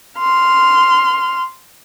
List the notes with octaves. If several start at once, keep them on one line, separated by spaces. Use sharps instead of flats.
C6 F6